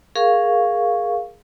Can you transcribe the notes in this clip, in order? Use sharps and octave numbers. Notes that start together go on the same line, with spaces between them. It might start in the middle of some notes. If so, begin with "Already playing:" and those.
G#4 A#4 F5 C#6